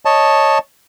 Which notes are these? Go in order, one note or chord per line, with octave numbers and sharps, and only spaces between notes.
C#5 D#5 A5